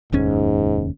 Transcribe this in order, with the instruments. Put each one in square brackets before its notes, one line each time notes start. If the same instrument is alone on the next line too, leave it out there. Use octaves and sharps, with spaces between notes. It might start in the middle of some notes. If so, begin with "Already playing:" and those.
[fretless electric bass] F1 D#2 C#4 [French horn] G#2